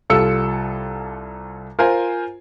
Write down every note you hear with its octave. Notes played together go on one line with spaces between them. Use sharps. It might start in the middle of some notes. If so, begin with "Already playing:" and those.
C2 G3 F4 A4 E6 C#7
F4 A#4 C5 G#5